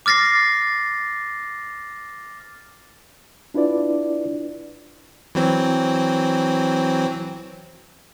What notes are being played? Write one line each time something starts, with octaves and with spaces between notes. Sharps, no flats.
D6 F6 A6 A#6 C7
D4 E4 F4 B4 D5
E3 F#3 C4